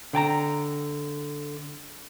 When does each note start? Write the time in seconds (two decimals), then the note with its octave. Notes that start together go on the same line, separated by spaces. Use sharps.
0.13 D3 G5 A5 A#5